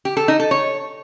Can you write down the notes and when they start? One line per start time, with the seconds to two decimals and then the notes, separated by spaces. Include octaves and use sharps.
0.05 G4
0.17 A4
0.28 D#4
0.40 A4
0.51 C#5